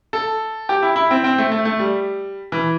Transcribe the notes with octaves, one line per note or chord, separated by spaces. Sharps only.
A4
G4
E4
E4
C4
C4
A3
A3
A3
G3
E3